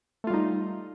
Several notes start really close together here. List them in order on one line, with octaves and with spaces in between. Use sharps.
A3 F4 G3 D#4